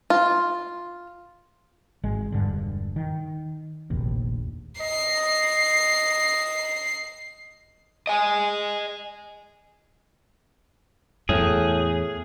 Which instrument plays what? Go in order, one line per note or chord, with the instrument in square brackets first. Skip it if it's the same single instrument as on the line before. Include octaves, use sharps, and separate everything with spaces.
[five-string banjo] F4
[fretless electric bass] G#1 G#3
E1 G2 D3
D#3
F1 A#1 D#2
[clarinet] D#5 [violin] C7
[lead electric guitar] D#5 G#5
[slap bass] E2 [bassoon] A2 [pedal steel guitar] G#4